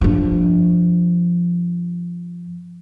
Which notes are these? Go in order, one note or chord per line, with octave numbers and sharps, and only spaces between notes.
G2 F3